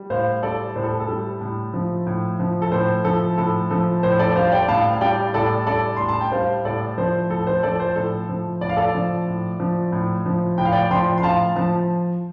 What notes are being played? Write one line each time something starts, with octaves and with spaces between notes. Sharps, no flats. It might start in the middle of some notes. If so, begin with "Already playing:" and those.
Already playing: G3
A2 C5 F5
G3 A4 D5
A2 C5
A4
A4
G3
A2
F3
A2
F3
A4
A2 C5
F3 A4
A2 A4
F3 A4
A2 C5
A4 D5
G3 C5 F5
D5 G5
A2 F5 A5
F5
G3 D5 G5
A2 A4 D5
G3 A4 D5
A2 C6
A5
G5
G3 C5 F5
A2 A4 D5
F3 C5
A2 A4
C5
F3 A4 D5
C5
A2 A4
F3
A2 D5
F5
A4 D5
F3
A2
F3
A2
F3
A2 G5
F5
D5 G5
F3 G5 C6
C6
A2 F5 A5
F3 A5